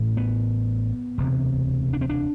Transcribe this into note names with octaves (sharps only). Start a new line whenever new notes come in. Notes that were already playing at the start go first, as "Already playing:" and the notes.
Already playing: A1 A2
B3
E1 D2 C3
D4
C4
D4